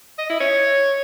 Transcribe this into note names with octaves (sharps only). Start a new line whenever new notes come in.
D#5
E4
C#5